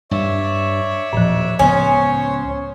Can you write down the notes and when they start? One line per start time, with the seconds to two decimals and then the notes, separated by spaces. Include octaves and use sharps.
0.11 G2 C#5 D5 E5
1.13 D#1 A2 F3
1.59 C#2 B3 C#4 C5 C#5 G#5